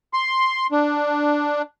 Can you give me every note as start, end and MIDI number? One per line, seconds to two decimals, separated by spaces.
0.13 0.67 84
0.72 1.62 62